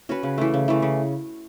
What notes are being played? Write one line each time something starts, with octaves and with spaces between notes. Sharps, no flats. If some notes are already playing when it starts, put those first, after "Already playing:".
C#4 F#4 B4
C#3
E3 A3
C#3
E3 A3
C#3